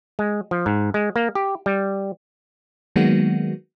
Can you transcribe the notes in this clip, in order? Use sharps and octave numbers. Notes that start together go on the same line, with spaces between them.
G#3
F3
G#2
G#3
A#3
G4
G3
D#3 F#3 G#3 A#3 B3 F#4